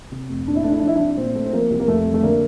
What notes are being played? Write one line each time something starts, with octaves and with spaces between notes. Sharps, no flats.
C3
F1
A#2 D4
E4
A3 D4
E4
F3 D4
E4
C2 D4
A#2 C4
A3
C4
F3 A#3
C2
A#3
F2 A3
G3
A3
D3 A#3